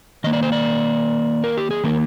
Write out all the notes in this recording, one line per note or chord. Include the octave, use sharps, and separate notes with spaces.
D#3 A#3 D#5
D5
C5
D5
A#4
G4
G#4
D#3 A#3 A#4